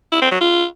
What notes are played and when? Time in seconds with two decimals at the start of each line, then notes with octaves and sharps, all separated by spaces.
0.12 E4
0.22 C4
0.31 F#3
0.41 F4